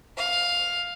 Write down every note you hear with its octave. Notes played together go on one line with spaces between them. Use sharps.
F5